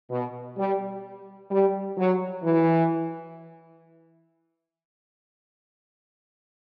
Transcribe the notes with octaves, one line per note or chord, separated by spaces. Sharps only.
B2
G3
G3
F#3
E3